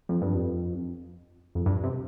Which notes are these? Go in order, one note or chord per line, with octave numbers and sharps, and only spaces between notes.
F2
G2
F2
F2
G2
C3